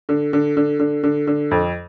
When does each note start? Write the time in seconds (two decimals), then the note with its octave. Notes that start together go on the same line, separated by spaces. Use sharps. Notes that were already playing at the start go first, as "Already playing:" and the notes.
0.09 D3
0.33 D3
0.57 D3
0.80 D3
1.03 D3
1.27 D3
1.51 F2